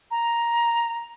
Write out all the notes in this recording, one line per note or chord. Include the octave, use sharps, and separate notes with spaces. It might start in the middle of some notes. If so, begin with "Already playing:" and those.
A#5